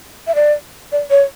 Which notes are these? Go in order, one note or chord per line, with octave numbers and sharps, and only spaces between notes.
E5
D5
D5
C#5